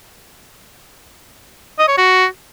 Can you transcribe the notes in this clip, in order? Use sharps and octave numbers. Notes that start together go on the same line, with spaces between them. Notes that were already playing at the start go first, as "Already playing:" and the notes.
D#5
C#5
F#4